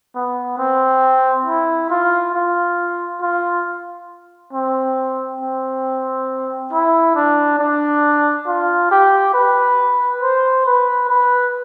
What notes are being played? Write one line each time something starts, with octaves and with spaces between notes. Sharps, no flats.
B3
C4
E4
F4
F4
F4
C4
C4
E4
D4
D4
F4
G4
B4
C5
B4
B4